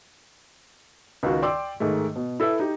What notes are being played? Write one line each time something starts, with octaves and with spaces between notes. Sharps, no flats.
C#2 D#3 F4 F#4
D5 G5 C6 D6 E6
G#2 D#3 G#3 A3
B2
E4 A4 B4 E5
D#4 G4